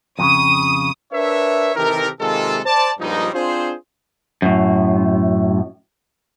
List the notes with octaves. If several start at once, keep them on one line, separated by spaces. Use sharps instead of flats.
F2 A#2 C#3 D#6
D4 A#4 B4 C#5 E5
C3 D#3 E3 G4 A4 A#4
C3 D#3 G#3 A#3 F4 A4
C5 D5 A5
G2 A#2 F3 G3 G#3 D#4
C4 D4 F4 G#4 C5
F#2 A2